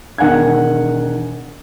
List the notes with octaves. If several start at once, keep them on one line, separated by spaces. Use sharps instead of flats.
E1 D#3 F#5 G#5 G#6